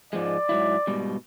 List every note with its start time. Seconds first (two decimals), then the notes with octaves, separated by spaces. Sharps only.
0.13 G#2 F3 G#3 D5
0.49 G#2 F#3 E4
0.87 G#2 B2 G3